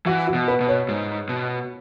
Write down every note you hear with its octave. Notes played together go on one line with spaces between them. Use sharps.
E3 F#4
F#4
B2
B4
B2
C#5
G#2
B2